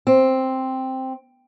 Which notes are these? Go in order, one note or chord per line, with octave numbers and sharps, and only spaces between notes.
C4